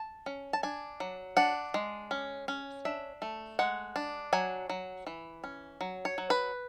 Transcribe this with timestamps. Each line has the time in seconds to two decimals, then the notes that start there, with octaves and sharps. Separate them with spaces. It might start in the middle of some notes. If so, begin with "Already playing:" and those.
Already playing: A5
0.26 C#4
0.53 A5
0.63 D4 G#5
1.00 F#3
1.37 D4 F#5
1.74 G#3
2.11 C#4
2.48 C#4
2.85 D4 E5
3.22 A3
3.59 G#3 F#5
3.96 D4
4.33 F#3 G#5
4.70 F#3
5.07 E3
5.44 C#4
5.81 F#3
6.05 C#5
6.18 F#3
6.30 B4